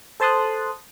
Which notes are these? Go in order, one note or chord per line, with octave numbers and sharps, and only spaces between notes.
A4 C5 A5 C6 D#6 F#6